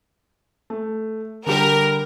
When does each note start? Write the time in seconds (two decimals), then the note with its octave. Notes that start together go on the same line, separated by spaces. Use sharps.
0.70 A3
1.46 D3 G3 G4 A#4